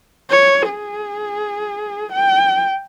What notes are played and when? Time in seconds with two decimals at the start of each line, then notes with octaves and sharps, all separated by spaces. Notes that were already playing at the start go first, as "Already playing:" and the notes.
0.30 C#5
0.69 G#4
2.12 G5